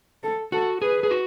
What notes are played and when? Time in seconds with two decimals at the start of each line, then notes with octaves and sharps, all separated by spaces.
0.23 A4
0.52 F#4 A4
0.82 G#4 B4
1.03 G#4
1.11 F#4